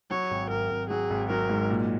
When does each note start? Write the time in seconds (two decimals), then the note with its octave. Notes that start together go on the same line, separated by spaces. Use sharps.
0.10 F#3 C#5
0.31 G#1
0.50 G#1 A#4
0.70 G#1
0.90 F#3 G#4
1.10 G#1
1.30 F#3 A#4
1.49 G#2
1.70 A#2